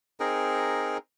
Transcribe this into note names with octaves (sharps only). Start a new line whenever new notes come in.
C4 D#4 G#4 A#4